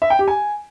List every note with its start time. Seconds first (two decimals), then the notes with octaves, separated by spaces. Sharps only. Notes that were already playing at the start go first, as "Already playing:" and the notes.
0.02 E5
0.10 G5
0.19 G4
0.28 G#5